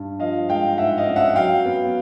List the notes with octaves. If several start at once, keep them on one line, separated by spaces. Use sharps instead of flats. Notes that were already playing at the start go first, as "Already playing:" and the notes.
Already playing: G2
F3 D#5 F5
G#3 F5 G5
G#2 E5 F#5
D#5 F5
C#4
E5 F#5
F#3 F5 G5
B3